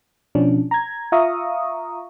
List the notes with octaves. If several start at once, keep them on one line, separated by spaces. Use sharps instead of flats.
B2 F3 C#4 D4
A#5 G#6
F4 E5 F5 A#5 C#6 D#6